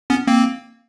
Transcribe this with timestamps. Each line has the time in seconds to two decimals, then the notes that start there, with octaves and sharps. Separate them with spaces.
0.10 B3 C#4
0.27 A#3 C4